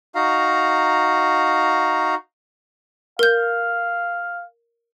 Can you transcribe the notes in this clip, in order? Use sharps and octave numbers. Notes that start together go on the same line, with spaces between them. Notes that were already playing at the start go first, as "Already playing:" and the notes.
D#4 F#4 F5 A#5
A#4 F5 G6